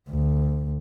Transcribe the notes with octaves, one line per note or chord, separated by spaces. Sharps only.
D2